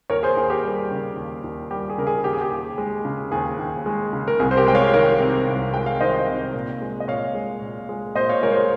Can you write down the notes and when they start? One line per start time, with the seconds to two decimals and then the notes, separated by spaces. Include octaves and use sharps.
0.10 D#2 A#4 C#5
0.23 G#4 C5
0.36 D#2 G#4
0.50 G4 A#4
0.63 G3
0.91 C#3
1.17 D#2
1.44 D#2
1.70 G3 G4 A#4
1.90 G#4
1.98 C#3 A#4
2.07 G#4
2.24 D#2 G4
2.33 G#4
2.41 G4
2.51 D#2
2.78 G#3
3.05 C#3
3.32 D#2 G#4
3.58 D#2
3.86 G#3
4.13 C#3
4.28 A#4
4.40 C2 G#4
4.51 C5
4.57 G4 A#4
4.66 G#3 G5
4.75 C#5 F5
4.93 D#3 A#4 C#5
5.20 C3
5.47 C2
5.74 G#3 G5
5.86 F5
6.01 D#3 C5 D#5
6.27 C3
6.54 A#2
6.81 G#3
7.00 D#5
7.08 A#2 C#5 F5
7.34 G#3
7.62 A#2
7.89 G#3
8.15 A#2 C5 D#5
8.29 C#5 F5
8.42 G#3 A#4 C#5
8.52 C5
8.55 A#4 C#5